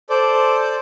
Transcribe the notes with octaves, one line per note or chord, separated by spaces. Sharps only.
A4 C5 D5